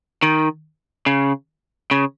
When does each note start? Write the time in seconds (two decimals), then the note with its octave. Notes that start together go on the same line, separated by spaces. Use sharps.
0.23 D#3
1.06 C#3
1.91 C#3